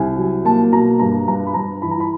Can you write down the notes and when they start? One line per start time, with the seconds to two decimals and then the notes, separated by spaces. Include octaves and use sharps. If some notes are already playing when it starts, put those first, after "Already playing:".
Already playing: C2 G#5
0.17 F#3
0.45 A#3 A5
0.72 B2 A#5
0.99 G2 A#5
1.28 G2 A#5
1.46 B5
1.54 G2 A#5
1.82 E3 B5
1.91 A#5
2.00 B5